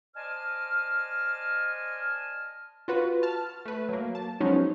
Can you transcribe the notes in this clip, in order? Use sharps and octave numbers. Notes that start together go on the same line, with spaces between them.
C5 D5 D#5 G#5 A5 F6
F4 F#4 B4
A5 F6
A3 B4
F#3 A#3
A5
F3 F#3 G#3 B3 C#4 D#4